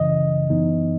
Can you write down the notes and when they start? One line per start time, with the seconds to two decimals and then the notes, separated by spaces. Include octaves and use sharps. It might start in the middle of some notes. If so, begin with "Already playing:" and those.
Already playing: F#2 C#3 E3 D#5
0.50 F#2 E3 B3 D#4